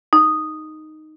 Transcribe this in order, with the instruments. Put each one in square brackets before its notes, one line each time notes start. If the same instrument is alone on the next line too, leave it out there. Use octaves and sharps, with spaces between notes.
[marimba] D#4